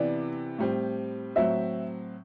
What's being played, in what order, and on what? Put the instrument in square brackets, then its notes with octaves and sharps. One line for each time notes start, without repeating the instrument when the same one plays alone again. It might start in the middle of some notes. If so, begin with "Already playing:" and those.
Already playing: [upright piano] C3 E3 B3 [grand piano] D5
[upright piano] A2 G3 C4
[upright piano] A2 F#3 C4 [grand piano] E5